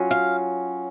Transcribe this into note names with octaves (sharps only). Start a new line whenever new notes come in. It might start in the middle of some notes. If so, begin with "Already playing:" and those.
Already playing: F#3 C#4 F4
F5